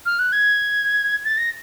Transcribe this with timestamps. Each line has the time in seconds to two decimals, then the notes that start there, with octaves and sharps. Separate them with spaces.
0.06 F6
0.19 F#6
0.33 G#6
1.25 A6
1.38 A#6